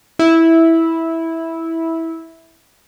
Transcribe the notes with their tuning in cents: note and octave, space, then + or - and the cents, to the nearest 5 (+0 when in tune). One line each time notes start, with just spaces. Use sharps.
E4 -10